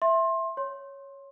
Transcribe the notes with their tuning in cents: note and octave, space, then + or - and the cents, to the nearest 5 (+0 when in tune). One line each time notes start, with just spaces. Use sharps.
E5 +0 C6 +25
C#5 +0 C6 +20